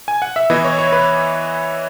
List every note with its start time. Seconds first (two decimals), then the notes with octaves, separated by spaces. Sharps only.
0.08 G#5
0.22 F#5
0.36 E5
0.50 E3 B3 E4 D#5
0.64 C#5
0.79 C#5
0.92 B4